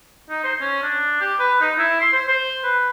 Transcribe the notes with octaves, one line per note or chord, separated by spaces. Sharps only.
D#4
C5
C#4
D4
G4
B4
D#4
E4
C6
C5
C5
B4